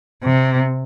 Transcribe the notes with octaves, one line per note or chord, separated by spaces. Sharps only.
C3